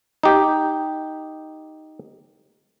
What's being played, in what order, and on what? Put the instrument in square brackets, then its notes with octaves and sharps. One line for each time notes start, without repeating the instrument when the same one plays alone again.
[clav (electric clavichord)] D#4 G4